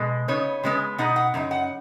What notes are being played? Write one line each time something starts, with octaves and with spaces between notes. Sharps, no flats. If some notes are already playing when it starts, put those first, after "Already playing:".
Already playing: B2 G#3
C#3 B3 D#4 C#5
C#3 G#3 B3
B2 B3 D#4 F#5
F#5
F#2 C#3 D#4
F#5